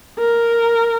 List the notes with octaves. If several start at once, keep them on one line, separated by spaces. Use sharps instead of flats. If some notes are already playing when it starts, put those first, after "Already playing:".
A#4